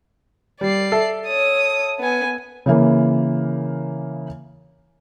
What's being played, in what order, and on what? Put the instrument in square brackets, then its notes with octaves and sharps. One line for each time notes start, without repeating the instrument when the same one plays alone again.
[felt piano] G3 [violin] D5 C7
[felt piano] A4 E5
[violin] C#5 D#6
B3 G#5
[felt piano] C#3 E3 A#3